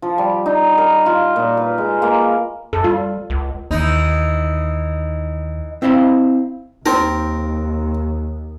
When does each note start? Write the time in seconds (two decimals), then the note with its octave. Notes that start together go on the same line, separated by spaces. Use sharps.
0.02 F3
0.18 G3
0.46 D#4
0.78 A#4
1.06 F4
1.36 A#2
1.57 B4
1.78 G#3
2.02 A#3
2.73 F#2 A4
2.84 G3 F4
3.30 C#2
3.71 D#2 E3 D#4
5.82 C4 E4 C5 D#5 F5 B5
6.86 D#2 C4 D#4 A#4